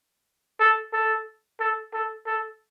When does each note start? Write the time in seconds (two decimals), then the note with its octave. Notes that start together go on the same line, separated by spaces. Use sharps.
0.60 A4
0.93 A4
1.60 A4
1.94 A4
2.27 A4